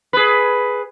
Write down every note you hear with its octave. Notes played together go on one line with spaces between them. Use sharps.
G#4 B4